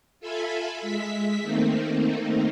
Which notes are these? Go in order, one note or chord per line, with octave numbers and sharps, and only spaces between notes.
F4 A4 E5 G#5 B5
G#3 E5 B6
D#3 A3 A#3 C4 D#4